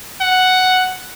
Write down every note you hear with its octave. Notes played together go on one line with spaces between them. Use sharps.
F#5